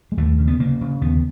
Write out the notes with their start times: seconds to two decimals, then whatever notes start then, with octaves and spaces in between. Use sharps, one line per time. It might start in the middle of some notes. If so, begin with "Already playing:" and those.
0.12 G#3
0.17 D#2 A3
0.39 C#3
0.48 B3
0.59 C#3 A#3
0.81 C#3
1.01 D#2 B3